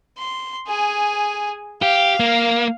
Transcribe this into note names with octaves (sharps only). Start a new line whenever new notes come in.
C6
G#4 G#5
G4 F5
A#3